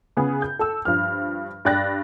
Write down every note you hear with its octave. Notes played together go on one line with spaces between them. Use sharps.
C#3 B3 G#4
G6
A4 E6
G2 F3 F6
G2 D5 G5 F#6 A6 A#6